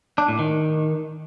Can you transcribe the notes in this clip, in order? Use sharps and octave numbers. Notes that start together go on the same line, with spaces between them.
D4
A2
D#3